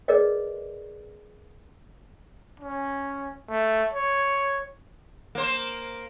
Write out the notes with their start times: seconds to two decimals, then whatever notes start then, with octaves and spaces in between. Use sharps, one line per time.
0.08 G#4 A#4 B4 D5 D#5
2.60 C#4
3.49 A3
3.94 C#5
5.35 A#3 C5